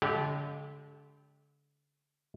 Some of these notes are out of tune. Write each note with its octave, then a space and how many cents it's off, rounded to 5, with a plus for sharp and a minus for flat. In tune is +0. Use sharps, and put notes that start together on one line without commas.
D3 -35 G#3 +35 G4 +0